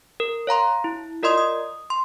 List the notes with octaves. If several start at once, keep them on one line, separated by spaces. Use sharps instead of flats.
A#4
C#5 F5 A#5 C6
E4
F4 A#4 D5 D#5 C6 D#6
D#6
C6